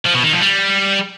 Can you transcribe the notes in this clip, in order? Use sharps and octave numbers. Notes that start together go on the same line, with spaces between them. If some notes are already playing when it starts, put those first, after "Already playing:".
F3
B2
D#3
F2
G3